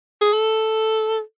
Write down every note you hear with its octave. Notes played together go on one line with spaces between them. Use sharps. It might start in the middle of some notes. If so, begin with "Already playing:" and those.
G#4
A4